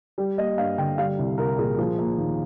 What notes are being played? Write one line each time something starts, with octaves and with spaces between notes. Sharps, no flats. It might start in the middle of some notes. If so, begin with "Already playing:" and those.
G3 G4
A#3 D#5
G2 F5
D3 G5
G3 F5
C2
C2 A#4
A#2 G#4
F3
A#3
D#2